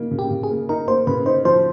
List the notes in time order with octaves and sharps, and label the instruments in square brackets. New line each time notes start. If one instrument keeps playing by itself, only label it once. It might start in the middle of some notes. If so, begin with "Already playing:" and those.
Already playing: [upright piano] C#3 A#3 D#4
C#3
[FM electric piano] G4
[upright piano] C#3
[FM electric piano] G#4
[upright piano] A#3
[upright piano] D#4 [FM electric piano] A#4
[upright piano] A#3 [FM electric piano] C5
[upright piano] C#3 [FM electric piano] B4
[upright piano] D#4 [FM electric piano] C5
[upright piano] F3 [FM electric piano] C5